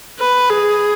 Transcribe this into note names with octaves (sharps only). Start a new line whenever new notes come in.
B4
G#4